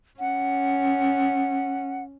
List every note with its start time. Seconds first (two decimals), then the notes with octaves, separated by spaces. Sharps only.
0.20 C#4 F#5